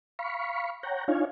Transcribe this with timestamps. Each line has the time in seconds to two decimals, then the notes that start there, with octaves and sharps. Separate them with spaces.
0.19 F5 B5 C#6
0.83 C#5 F#5 G5 A#5
1.08 D4 D#4 F4 C#5 F5 G#5